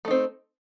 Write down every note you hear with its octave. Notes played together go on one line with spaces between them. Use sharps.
A3 C4 D#4